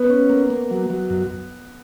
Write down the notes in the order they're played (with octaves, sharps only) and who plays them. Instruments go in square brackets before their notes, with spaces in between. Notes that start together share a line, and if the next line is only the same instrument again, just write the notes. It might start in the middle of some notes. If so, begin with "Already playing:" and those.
Already playing: [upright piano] B3
[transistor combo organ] C#4
A#3
A#3
F#3
F#3
F#2